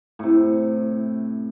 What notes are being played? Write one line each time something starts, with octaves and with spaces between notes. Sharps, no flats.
A2 C3